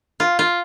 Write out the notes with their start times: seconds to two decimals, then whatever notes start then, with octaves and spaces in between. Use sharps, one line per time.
0.20 F4
0.39 F4